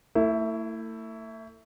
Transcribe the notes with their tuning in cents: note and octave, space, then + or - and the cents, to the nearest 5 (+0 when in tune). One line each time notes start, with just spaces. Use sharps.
A3 +40 E4 +0